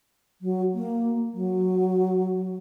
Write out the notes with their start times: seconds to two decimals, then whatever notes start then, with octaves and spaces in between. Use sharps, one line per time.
0.41 F#3
0.74 A#3
1.33 F#3